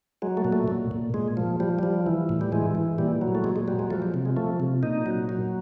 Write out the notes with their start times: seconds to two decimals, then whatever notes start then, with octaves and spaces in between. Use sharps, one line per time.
0.22 F#3 G#3
0.37 A3
0.45 A#2
0.52 A3
0.68 A#2
0.91 A#2
1.14 A#2 G#3
1.37 F3
1.60 F3 G3
1.79 F3 G3
2.06 E3
2.29 A2
2.41 G3
2.52 E3 G#3
2.75 E3
2.98 A#2 G3
3.21 F#3
3.35 A3
3.44 A#2 G#3
3.56 G#3
3.68 F#3 G3
3.79 G#3
3.90 F3 A3
4.02 G3
4.14 C3
4.26 G#3
4.36 F3 A3
4.60 C3
4.83 A#2 D#4
5.06 F#3
5.29 F#3